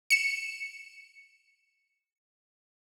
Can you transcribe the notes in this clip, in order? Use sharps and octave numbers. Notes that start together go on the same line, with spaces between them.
C#7 E7